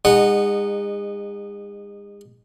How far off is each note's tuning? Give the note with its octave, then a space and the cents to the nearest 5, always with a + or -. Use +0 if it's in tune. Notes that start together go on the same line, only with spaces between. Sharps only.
G#3 -40 D#4 -20 F#5 +0